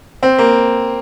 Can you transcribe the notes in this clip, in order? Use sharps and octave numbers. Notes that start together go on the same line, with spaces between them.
C4
A#3